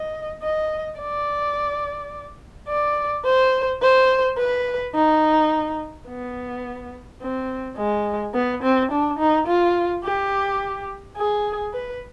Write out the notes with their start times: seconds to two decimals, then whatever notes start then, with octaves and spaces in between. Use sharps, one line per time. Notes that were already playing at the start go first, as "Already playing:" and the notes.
Already playing: D#5
0.43 D#5
1.00 D5
2.69 D5
3.25 C5
3.82 C5
4.38 B4
4.95 D#4
6.08 B3
7.22 C4
7.77 G#3
8.34 B3
8.63 C4
8.91 D4
9.19 D#4
9.48 F4
10.04 G4
11.17 G#4
11.74 B4